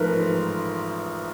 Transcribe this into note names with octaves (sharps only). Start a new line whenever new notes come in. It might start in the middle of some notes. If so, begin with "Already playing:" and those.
Already playing: A1 G#2 F3 A3 A#4 B4